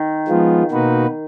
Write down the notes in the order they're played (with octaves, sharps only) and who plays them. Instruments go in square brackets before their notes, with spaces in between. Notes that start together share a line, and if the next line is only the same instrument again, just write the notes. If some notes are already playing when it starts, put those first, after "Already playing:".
Already playing: [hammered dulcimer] D#3
[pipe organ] F3 G#3 B3 F4
B2 A#3 D#4 F#4 B4